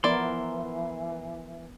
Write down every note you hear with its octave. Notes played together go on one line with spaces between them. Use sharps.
E3 F3 B3 E4 A#4 D5 C6